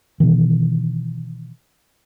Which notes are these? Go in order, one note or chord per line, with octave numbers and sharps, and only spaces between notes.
B2 D#3 E3